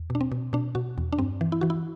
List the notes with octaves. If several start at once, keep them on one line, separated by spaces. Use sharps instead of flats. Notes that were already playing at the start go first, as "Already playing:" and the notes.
Already playing: E2
B2
D4
C4
B2
B2 D4
B2 F#4
E2
D4
G2 C4
E3
E4
E3 F#4
E4